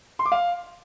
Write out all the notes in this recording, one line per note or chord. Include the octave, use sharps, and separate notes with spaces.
C6
D6
F5